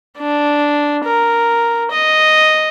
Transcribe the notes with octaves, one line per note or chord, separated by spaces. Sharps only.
D4
A#4
D#5